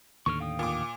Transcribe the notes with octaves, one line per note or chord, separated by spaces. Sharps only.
D#2 A2 D3 C#6 F6
F5 G5 D#6
A#2 D6